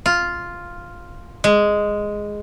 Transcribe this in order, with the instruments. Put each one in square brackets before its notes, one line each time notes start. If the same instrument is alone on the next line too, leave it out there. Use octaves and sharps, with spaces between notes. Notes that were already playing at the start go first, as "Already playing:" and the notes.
[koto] F4
G#3